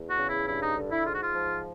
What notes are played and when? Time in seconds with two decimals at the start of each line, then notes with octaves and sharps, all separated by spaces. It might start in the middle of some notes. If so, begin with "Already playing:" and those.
Already playing: E2
0.09 F#4
0.18 C#3
0.28 E4
0.47 G2 E4
0.61 D#4
0.76 D3
0.90 E4
1.04 G#2 F4
1.13 F#4
1.22 F4
1.33 F3